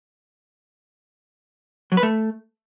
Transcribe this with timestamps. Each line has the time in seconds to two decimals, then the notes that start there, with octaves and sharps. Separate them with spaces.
1.92 F#3
1.97 B4
2.03 A3